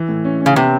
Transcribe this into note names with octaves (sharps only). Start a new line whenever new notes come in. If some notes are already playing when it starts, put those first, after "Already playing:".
Already playing: E3
A2
C#4
C#4
C#3
C3 B3